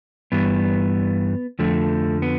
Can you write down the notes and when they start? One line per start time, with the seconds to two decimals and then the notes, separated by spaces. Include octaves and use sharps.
0.32 G2 E3 G3 B3
1.59 F2 D3 F3 A3
2.22 B3